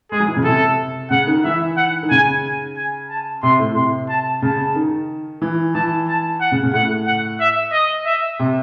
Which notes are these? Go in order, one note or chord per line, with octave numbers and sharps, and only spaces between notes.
G#3 G#4
F#3
E3
C#3
C3 A4
C#3 F#5
D#3
E3 E5
F#5
D#3
C#3 G#5
G#5
A5
C3 C6
A2
C3 C6
A5
C#3 A5
D#3
E3
E3 A5
A5
F#5
C#3
C#3
A2 F#5
F#5
E5
D#5
E5
C3